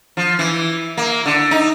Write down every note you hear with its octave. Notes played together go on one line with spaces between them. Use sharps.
F3
E3
A#3
D3
D#4